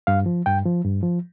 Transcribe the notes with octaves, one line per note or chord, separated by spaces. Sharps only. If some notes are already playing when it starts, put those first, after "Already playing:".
G2 F5
F3
G2 G5
F3
G2
F3